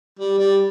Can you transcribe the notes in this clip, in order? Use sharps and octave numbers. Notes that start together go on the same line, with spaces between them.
G3
G3